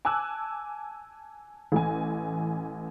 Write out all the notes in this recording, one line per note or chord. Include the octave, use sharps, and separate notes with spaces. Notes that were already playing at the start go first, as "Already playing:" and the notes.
G#5 A5 D6 E6 F#6
A1 E3 G#5